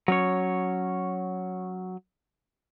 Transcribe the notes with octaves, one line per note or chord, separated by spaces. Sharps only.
F#3 C#4 C#5